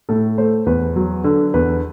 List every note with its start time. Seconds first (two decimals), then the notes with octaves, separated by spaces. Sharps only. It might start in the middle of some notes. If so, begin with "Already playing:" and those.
0.09 A2 A4
0.38 A3 C5
0.66 E2 B4
0.96 F#3
1.24 D3
1.54 E2 B4